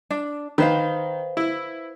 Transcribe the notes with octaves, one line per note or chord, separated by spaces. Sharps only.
D4
D#3 B4 C5 F5
E4